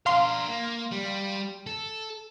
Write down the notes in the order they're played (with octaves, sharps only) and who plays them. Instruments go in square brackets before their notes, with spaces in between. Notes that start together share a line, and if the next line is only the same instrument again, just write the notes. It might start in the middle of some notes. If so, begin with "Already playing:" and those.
[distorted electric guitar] D4 A#4 [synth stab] F5 C6
[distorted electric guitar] A#3
G3
A4